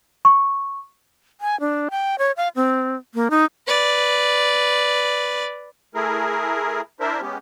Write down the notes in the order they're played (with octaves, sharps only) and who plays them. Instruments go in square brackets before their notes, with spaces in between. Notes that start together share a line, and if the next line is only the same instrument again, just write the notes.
[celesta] C#6
[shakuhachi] G#5
D4
G5
C#5
F5
C4
A#3
D#4
[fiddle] B4 D5
[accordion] A3 E4 G#4 A#4
D4 E4 A#4 C5 E5
G#3 B3 C#4 G4